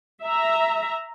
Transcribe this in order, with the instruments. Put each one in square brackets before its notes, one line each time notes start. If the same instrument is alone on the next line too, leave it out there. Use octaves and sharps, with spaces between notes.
[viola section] E5 A#5